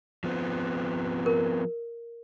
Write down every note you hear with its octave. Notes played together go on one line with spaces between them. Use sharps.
F3 B3 C4
A#4